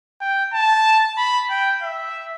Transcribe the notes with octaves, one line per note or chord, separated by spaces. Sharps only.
G5
A5
B5
G5
E5